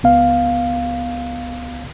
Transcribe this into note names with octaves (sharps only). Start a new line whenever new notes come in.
C#2 B3 F5